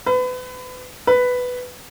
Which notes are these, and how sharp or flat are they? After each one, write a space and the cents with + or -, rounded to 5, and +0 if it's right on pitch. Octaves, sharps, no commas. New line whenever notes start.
B4 +30
B4 +5